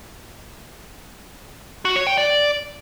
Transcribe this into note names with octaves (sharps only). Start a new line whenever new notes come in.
F#4
C#5
G5
D5